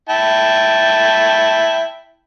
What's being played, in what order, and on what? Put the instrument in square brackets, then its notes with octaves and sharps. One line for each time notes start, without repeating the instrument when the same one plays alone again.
[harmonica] E4 G5 A5